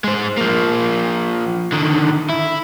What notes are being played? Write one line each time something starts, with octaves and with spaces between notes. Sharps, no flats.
G#3 C5
F3 A#3
D3 D#3
E4